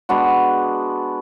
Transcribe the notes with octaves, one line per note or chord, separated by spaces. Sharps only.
G#3 B3 D4 F#4